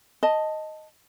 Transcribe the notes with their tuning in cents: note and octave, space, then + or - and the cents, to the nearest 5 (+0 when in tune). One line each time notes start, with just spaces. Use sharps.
D#5 +0 A5 +5